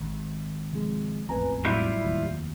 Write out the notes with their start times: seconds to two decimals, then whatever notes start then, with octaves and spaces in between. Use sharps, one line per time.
0.01 G#1
0.72 C3 F3 G#3
1.29 E1 A1 F2 B4 G#5 A#5
1.65 A2 F#3 G3 E4 F4 G6
2.04 F1 D#2